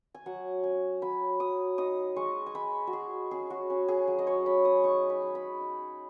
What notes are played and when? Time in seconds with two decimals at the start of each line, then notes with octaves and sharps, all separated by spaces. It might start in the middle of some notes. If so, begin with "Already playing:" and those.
0.14 G#5
0.26 F#3 F#5
0.63 C#4 G#5
1.02 F#3 B5
1.40 F#3 D#6
1.78 D#4 D#6
2.16 G#3 C#6
2.46 G#5
2.55 G#3 B5
2.87 F#4
2.93 G#3 G#4
3.31 C#4 G#4
3.50 F#4
3.70 C#4
3.88 G#4
4.08 F#3
4.19 D#5
4.27 C#5
4.46 C#4 B5
4.65 D#6
4.84 D#4 C#6
5.10 B5
5.22 G#3
5.35 B5
5.61 D#4